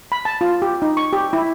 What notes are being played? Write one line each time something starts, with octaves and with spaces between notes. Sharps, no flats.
B5
A5
F4
G4
D#4
C#6
G4
E4